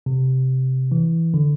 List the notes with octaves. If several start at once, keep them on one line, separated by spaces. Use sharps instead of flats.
C3
E3
D3